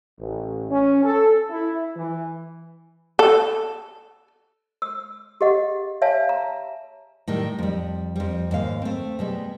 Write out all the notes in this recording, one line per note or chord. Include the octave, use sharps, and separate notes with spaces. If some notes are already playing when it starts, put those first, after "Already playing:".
A1
C#4
A4
E4
E3
A4
E6
G4 G#4 D#5 F#5
C#5 E5 F5 G#5 A5
A#5
A2 D#3 G3
F2 G3
F2 G3
D#2 G#2 F5
A3 C4
B2 G3 G#3